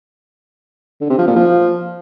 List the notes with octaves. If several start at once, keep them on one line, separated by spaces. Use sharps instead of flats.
D3
C3
F3
A#2
F3